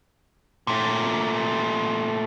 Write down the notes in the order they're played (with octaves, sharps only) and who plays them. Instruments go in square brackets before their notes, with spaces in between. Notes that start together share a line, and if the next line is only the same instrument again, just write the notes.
[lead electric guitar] A#2 A3